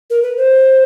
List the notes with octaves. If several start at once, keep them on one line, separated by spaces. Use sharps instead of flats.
A#4
B4
C5